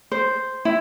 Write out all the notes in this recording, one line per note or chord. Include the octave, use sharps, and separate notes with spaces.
C5
E4